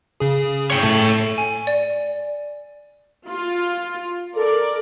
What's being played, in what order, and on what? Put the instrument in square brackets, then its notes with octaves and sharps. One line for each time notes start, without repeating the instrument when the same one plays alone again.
[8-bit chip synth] C#3 G#4
[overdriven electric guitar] C#5 G5
[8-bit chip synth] A2 A6 [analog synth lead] A3
[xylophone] G#5
D5
[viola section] F4
[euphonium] A4 [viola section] A#4 D5